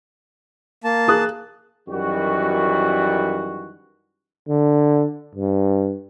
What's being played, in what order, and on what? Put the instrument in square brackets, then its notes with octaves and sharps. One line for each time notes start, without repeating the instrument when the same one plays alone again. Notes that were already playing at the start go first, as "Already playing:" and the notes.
[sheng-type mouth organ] A#3 A5
[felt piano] G#4 D#6 F#6
[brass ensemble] F#2 D#3 E3 G3 F#4
[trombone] D3
G2